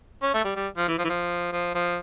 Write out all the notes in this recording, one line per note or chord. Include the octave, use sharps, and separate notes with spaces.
C#4
A3
G3
G3
F3
E3
F3
E3
F3
F3
F3